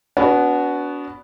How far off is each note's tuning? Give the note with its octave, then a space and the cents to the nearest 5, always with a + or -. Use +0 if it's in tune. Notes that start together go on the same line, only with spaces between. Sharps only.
B3 +0 D4 -40 F#4 +0